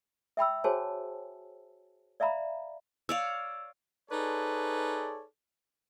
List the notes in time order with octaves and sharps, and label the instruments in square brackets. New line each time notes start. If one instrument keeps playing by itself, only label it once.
[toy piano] E5 G5 B5 E6
F#4 G#4 C5 C#5 G#5 A5
D5 E5 F5 A#5 B5
[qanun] C#5 D5 F5 [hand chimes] E6
[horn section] D#4 G#4 A4 B4 C#5 D5